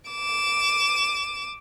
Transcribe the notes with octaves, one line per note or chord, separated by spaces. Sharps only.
D6 E7